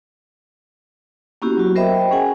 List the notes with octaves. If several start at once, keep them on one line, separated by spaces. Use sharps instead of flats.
A#3 B3 C#4 E4 F#4 G4
F#3 F#4
A#4 C5 D#5 E5 G5 B5
D#5 G5
C#4 G#4 F#5 G#5